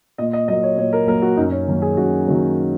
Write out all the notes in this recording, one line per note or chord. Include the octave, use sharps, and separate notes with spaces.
A#2 D#5
D#5
F#3 A#3 D#5
C#5
A#2 C#5
A#4
F#3 A#3 A#4
F#4
F#2 D#4
C#4
D#3 F#3 A#3
G#4
F#2 F#4
D#3 F#3 A#3